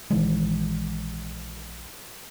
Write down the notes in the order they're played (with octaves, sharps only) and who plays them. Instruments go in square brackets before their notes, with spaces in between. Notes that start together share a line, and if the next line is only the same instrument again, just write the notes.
[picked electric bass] A#1 D#3 E3 G#3